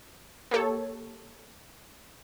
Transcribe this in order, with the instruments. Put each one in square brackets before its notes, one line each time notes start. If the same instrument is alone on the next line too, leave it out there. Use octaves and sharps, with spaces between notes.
[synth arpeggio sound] A#3 G4 A4 C#5